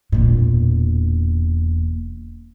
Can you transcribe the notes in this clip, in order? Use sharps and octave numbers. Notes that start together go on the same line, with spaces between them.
E1 A#2